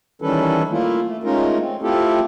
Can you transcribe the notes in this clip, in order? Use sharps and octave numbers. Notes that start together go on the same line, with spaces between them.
D#3 E3 G3 C#4 A4 B4
A3 A#3 E4 F4
A3
G#3 A3 C#4 D#4 F4 A#4
C4
A3 C4 E4 F4 G4 A4